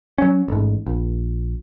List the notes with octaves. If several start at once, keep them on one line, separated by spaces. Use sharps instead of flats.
F#3 C#4
A1 G#2
A#1